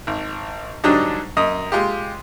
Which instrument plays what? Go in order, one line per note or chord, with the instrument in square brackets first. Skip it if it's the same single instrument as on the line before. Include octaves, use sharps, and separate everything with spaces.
[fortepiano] G#1
G#2 D3 F#3 G3 D4 D#4
F#2 D#5 D#6
G#3 F4 G4